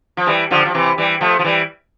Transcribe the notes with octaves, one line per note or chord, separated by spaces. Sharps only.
F3
E3 G3
D3 F3
F3
C3 E3
E3 G3
F3 A3
F3
E3 G3